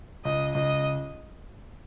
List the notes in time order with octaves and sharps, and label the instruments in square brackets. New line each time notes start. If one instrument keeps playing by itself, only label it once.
[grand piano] C#2 [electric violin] D#5
[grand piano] C#2 [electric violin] D#5